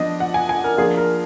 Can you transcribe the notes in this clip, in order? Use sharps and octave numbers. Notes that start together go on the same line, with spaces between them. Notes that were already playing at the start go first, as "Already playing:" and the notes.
Already playing: F3 B3 D4 D#5
F#5
G#5
G#5
A#4
F3 A#3 D4 F4 G#4
A#4